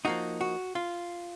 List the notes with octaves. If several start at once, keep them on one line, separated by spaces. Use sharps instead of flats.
F3 A#3 D#4 F#4
F#4
F4